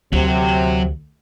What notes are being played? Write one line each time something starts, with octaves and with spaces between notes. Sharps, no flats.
D2 C3 F#3